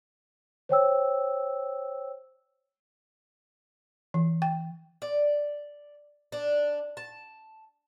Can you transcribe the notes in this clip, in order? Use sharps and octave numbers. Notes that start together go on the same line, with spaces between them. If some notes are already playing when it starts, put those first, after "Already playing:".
C5 C#5 G5 E6
E3
G5
D5
D4
A5